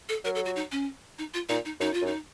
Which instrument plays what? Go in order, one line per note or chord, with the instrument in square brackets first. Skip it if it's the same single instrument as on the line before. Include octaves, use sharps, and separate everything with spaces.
[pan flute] A4
[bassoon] F#3 [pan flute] A#4
[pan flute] A4
F#4
D#4
C#4
D#4
F4
[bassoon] A#2 [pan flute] D#4
[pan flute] D#4
[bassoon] F#2 [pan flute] D#4
[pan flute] F4
[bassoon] F#2 [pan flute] D#4